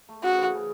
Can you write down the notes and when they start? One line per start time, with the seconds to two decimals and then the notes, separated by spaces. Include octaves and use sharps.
0.09 A3
0.23 C#3 F#4
0.38 E3
0.53 C#3